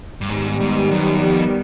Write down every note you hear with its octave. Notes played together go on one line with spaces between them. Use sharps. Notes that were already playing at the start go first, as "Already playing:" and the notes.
G2
G#2 D#3 G3 B3
G#2
F#2
F2